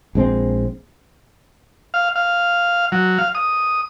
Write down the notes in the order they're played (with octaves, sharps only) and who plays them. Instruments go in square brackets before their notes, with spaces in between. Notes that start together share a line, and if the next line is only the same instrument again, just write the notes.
[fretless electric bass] A#1 G#3 C4
[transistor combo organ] F5
F5
F#3
F5
D#6